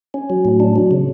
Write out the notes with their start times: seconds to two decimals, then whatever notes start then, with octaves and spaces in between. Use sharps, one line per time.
0.14 C#4
0.30 F#3
0.45 A2
0.60 D4
0.76 F#3
0.91 C#3